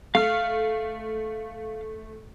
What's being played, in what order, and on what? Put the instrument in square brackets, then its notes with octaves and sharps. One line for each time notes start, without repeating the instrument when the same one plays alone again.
[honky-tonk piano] A3 [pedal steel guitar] F5 F6